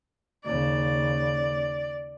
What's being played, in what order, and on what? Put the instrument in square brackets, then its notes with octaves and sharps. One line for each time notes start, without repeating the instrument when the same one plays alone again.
[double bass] D#2 C#3 [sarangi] D5